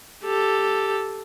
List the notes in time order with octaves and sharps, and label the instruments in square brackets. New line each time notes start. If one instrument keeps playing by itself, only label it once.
[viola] G4 A4